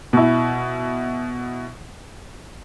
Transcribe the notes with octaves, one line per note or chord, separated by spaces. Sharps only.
B2 E4